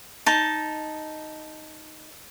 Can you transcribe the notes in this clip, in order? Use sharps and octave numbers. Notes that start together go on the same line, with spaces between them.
D#4 A5